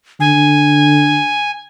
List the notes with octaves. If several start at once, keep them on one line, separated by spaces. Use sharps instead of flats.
D3 G#5